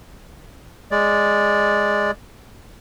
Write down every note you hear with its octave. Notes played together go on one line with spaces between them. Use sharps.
G#3 D5